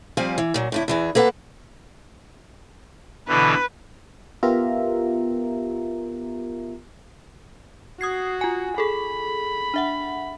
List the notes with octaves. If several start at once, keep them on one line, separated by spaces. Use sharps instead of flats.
F3 G3 C4 F5 G#5
E3
A#2 F#3
A2 D3 E4
E2 E3 G#4
A#3 A4 B4 F#5
B2 D3 E3 B4
B3 F4 G4 A#4 E5 A#5
F#4 D#6 G#6 C7
F4 G#5
G#4 A4 B5
D4 E5 F#5